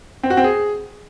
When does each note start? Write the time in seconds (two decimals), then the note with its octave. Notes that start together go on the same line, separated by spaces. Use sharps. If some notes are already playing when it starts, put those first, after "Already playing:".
0.23 C4
0.30 F#4
0.37 C4
0.44 G#4